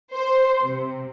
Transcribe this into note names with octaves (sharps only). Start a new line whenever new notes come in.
C5
C3